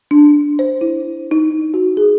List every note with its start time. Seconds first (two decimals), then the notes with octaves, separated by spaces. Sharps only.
0.11 D4
0.59 C5
0.81 E4
1.31 D#4
1.74 F#4
1.97 G#4